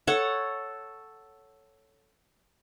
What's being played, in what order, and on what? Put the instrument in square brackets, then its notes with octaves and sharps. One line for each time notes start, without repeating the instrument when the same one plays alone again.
[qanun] A4 C#5 F#5